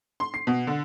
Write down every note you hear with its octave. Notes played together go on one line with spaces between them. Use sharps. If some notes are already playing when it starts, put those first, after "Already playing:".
C6
C7
B2
D3